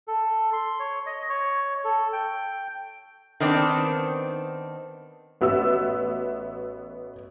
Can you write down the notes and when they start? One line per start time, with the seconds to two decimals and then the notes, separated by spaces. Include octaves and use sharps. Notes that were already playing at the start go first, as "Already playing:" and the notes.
0.08 A4
0.53 C6
0.80 C#5
1.06 D#5
1.29 C#5
1.84 A4
2.13 G5
3.40 D#3 B3 C4 D4
5.41 A1 B3 F#4 E5 E6